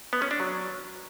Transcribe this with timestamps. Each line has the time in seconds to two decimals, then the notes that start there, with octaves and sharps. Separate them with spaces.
0.13 B3
0.22 C#4
0.31 D4
0.40 F#3